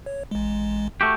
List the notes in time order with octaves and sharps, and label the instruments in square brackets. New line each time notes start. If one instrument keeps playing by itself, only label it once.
[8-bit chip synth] C#5
A1 G#3
[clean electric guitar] A3 F#4 G4